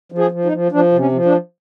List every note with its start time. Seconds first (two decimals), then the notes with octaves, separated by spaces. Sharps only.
0.12 F3
0.18 G#4
0.31 F3
0.45 D#4
0.52 F3
0.72 F3 D4
0.92 C3
0.99 C#4
1.12 F3
1.25 D4